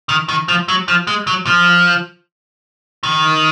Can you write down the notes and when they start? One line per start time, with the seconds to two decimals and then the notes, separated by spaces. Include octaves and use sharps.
0.09 D#3
0.29 D#3
0.48 F3
0.68 F#3
0.88 F3
1.07 G#3
1.27 F#3
1.47 F3
3.03 D#3